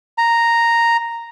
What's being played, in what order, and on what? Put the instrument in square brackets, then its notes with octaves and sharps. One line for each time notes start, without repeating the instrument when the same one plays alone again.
[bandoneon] A#5